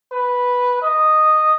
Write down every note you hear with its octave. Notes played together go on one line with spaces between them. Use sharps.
B4
D#5